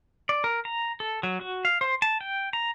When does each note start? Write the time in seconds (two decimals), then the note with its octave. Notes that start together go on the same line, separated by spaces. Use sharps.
0.29 D5
0.44 A#4
0.65 A#5
1.00 A4
1.23 F#3
1.41 F#4
1.65 F5
1.81 C5
2.02 A5
2.21 G5
2.53 A#5